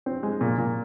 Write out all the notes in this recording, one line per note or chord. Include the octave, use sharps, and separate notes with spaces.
C4
G#3
A#2
A#2